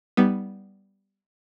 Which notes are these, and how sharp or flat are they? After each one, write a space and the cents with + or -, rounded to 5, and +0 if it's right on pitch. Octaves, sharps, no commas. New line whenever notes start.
G3 +0 B3 +0 D#4 +15